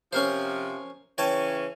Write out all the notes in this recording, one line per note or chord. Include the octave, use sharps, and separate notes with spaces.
C3 F3 C#4 A#4 C5
C#3 E3 C#4 C#5 G5 A5